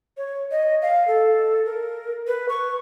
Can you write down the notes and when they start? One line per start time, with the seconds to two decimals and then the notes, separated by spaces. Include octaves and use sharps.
0.17 C#5
0.51 D#5
0.82 F5
1.08 A4
1.65 A#4
2.27 B4
2.49 C#6